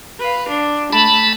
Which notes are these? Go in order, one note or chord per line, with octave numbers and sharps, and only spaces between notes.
B4 F5
D4
A3 A5 B5